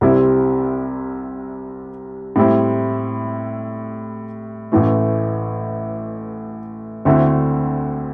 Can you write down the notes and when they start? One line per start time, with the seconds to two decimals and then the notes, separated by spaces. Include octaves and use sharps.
0.01 C2 C3 G3 C4 E4
2.36 A2 G3 C4 E4
4.72 A1 A2 E3 A3
7.05 D2 D3 A3 C4 E4